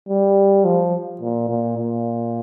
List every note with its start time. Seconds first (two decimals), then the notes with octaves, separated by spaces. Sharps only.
0.09 G3
0.65 F3
1.21 A#2
1.49 A#2
1.77 A#2